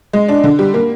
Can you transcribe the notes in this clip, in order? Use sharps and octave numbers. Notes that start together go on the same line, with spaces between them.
G#3
D4
D3
G3
A#3